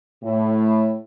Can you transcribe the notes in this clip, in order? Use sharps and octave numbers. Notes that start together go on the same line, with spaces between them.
A2